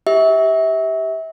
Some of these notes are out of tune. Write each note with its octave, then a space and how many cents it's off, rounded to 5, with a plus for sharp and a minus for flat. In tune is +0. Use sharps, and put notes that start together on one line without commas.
G4 +0 E5 -30